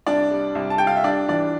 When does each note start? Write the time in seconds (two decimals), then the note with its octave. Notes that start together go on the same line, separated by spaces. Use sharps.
0.07 C2 D4 D5
0.31 G3
0.55 C2
0.70 A5
0.78 G3 G5
0.87 F5
0.96 E5
1.04 G3 D4 D5
1.29 E3 D4 D5